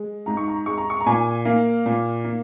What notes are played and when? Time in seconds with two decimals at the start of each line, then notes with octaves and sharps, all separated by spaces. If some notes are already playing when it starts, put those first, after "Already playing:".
Already playing: G#3
0.26 G#2 A#5
0.37 C#6
0.48 A#5
0.66 G#3 C#6
0.78 A#5
0.90 C#6
1.00 A#5
1.06 A#2 G#5
1.45 A#3 F5
1.86 A#2
2.24 A#3